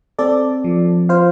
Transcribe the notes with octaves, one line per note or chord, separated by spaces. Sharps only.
C4 A4 D5
F3
F4 C5 F5